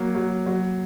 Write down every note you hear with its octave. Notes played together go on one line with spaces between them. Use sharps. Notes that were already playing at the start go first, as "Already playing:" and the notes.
Already playing: F#3 A#3
F#3
F#3